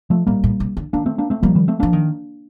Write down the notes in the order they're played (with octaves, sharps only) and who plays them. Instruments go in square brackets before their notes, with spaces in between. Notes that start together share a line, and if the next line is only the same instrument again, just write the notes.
[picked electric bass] F3 A3
[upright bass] A2 [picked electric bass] G3 A#3
[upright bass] A2
C3
D3
[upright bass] D#3 [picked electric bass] A#3 D4
[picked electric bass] A3 C4
A#3 D4
A3 C4
[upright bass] F3 [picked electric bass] G3 A#3
[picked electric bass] D#3 G3
A3 C4
[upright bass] F3 [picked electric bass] A#3 D4
[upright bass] D#3